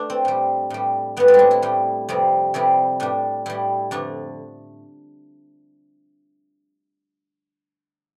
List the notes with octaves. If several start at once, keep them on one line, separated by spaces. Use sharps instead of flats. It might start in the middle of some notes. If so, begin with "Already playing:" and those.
Already playing: A3 D4
C4
A2 G3
A2 G3
A2 G3 B3
C4
D4 E4
E4
A2 G3
F2 C3 G3
F2 C3 G3 E4
A2 G3 D4
A2 G3 E4
F2 D3 A3 D4